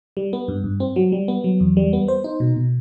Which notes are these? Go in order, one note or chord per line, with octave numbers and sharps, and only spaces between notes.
G3
B3
G2
G2
C4
F#3
G3
B3
F#3
E2
G3
B3
C5
D#4
B2
B2